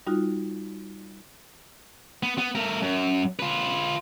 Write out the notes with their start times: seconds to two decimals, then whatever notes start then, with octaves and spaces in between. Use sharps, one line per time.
0.07 G3 D#4 F4 F#4
2.23 B3
2.38 B3
2.55 A3 A#4
2.82 F#2
3.39 F4 B4